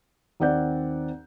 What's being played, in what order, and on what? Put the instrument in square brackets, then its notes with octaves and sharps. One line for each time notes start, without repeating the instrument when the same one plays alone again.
[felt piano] D#2 C4 D5 F#5 G6